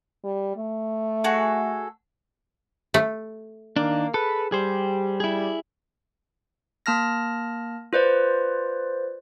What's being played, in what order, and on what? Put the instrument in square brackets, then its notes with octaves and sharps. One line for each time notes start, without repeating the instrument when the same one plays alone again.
[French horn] G3
A3
[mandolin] F#4 G#4 A4
[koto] A3
[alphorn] D#3 [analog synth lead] A#3 [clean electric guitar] D4
[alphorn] G#4 [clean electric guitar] A4 [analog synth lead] B4
[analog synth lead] G3 [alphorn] G4 [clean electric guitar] G#4 C5
[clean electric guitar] E4 G#4
[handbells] A#3 A5 F6 A#6
F4 B4 C5 D5